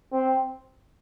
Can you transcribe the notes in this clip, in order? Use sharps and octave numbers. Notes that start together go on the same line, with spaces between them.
C4